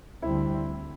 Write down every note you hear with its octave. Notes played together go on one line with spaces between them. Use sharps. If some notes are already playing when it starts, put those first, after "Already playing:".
D2 D3 G3 C4 E4